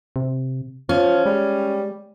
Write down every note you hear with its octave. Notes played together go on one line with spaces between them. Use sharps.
C3
F3 C#4 F4
G3 G#3